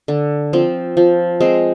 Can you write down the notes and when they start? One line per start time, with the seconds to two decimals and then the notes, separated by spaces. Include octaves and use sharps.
0.08 D3
0.53 F3 C4
0.97 F3
1.41 G#3 C4